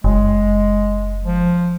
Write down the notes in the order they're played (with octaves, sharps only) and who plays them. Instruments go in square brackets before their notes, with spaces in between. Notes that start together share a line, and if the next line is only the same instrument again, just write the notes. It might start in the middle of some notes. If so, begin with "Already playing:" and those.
[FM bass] F#1 [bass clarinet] G#3
[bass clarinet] F3